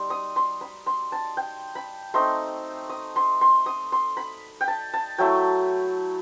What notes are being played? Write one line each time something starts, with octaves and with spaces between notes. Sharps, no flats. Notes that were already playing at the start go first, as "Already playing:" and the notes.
Already playing: G3 D#4 C6
D#6
C6
B5
C6
A5
G5
B5
A3 C4 D#4 C6
D#6
C6
C6
D#6
C6
B5
G5
A5
A5
F#3 A3 E4 G5